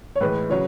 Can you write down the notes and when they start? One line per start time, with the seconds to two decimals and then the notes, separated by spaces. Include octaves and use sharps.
0.16 C#5
0.21 A2 E3 G#3 B4
0.50 C#3 F#3 C#5